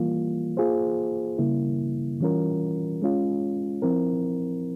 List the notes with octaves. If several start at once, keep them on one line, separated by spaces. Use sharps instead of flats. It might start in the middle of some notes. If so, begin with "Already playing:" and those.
Already playing: E3 G3 A#3 F4
A#3 F4 G#4 C5
C#3 G3 A#3 E4
E3 G3 C#4 F4 A#4
G#3 C#4 F4
F3 C4 E4 A#4